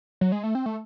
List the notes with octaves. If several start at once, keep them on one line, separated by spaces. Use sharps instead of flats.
F#3
G#3
A3
C4
A3